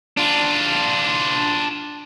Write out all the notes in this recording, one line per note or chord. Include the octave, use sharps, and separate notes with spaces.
D4 F4